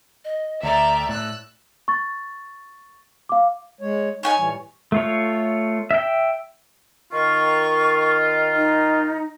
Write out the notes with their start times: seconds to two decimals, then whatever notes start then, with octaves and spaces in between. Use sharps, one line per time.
0.25 D#5
0.63 D2 D5 E5 G5 A#5
1.09 A2 E6 F#6
1.88 C#6 A6
3.29 F5 D6
3.81 G#3 C#5
4.23 D#4 C#5 G5 G#5
4.38 A2 E3 G3
4.92 A3 F4 C#5
5.91 E5 G5
7.12 D#3 F4 C#6
8.56 D#4